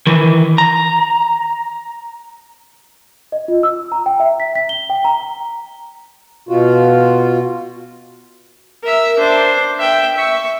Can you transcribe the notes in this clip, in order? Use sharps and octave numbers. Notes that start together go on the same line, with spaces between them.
D#3 E3
A#5
D#5
F4
E6
A#5
G5
E5
B6
B6
G7
G5
A#5
B2 F4 F#4
A#4 E5
D4 C5
E5 G5
E5 C#6